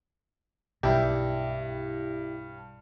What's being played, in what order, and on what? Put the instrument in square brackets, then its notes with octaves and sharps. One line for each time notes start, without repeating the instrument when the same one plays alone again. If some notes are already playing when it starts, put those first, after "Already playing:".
[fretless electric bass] B1 [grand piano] G2 [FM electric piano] E4 G4